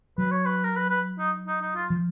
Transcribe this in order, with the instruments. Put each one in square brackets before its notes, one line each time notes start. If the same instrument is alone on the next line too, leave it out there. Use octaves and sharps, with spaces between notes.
[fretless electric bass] F#3 [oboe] B4
[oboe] C#5
B4
A#4
B4
B4
D#4
D#4
D#4
F4
[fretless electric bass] F3